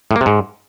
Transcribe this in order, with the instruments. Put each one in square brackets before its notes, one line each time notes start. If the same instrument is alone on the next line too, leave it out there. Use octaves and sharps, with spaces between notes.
[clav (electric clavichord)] A2
A#3
C3
G#2